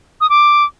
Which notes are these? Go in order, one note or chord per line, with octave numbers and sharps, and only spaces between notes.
D#6
D6